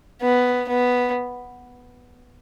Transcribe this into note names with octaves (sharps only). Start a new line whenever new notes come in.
B3
B3